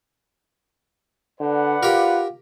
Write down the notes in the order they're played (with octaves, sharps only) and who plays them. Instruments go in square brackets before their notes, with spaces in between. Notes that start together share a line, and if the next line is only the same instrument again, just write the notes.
[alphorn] D3 [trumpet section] B4 D5 F#5
[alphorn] F4 [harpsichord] G4 A#4